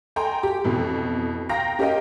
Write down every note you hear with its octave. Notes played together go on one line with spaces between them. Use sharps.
A4 G5 G#5 A#5 C6
G4
F2 B2 E3
F5 G5 A#5 A#6
C#4 G4 A#4 D#5 F5 G5